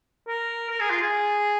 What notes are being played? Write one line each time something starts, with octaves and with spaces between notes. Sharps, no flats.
A#4
A#4
G#4
F4
G#4